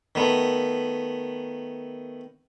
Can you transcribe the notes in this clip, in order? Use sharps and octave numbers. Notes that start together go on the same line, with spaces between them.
D#3 A3 B3